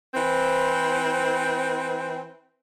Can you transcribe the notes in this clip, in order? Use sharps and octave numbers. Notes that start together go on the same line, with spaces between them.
E3 C4